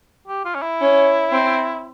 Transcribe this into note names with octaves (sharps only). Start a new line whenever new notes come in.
G4
F4
C#4
E4
C#4
C4